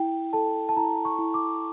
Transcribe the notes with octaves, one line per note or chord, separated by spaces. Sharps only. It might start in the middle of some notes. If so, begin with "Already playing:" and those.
Already playing: E4 G5
A4 A5
A5
E4 A#5
C#6
E4
D6